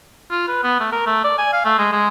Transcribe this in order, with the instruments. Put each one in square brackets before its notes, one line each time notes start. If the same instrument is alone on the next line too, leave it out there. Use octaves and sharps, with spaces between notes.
[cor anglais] F4
B4
B3
A3
A#4
A3
D5
G#5
F5
A3
G#3
G#3